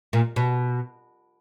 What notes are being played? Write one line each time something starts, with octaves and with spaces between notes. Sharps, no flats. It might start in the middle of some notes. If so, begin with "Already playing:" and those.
A#2
B2